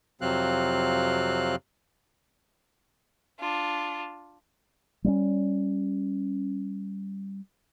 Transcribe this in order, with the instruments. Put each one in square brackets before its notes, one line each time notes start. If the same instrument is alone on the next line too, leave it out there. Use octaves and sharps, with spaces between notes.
[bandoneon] F2 C3 F#3 C4 F5 F#6
[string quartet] D4 F4
[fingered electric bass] G3 A3 C#4